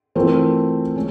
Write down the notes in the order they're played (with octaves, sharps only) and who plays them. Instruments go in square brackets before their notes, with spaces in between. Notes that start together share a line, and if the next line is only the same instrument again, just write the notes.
[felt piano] E3 A3 C4 F4 A#4
G#3 C#4